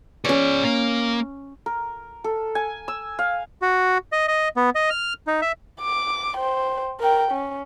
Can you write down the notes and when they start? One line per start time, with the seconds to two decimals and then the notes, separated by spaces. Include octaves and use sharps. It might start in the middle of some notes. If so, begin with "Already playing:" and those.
0.25 C#4 G#4 C#5 D5
0.64 A#3
1.66 A#4
2.24 A4
2.55 G#5
2.88 E6
3.19 F5
3.62 F#4
4.12 D#5
4.28 D#5
4.57 B3
4.75 D#5
4.90 F6
5.27 D#4
5.42 E5
5.81 D6
6.37 C5 G5
7.00 A#4 G5
7.32 C#4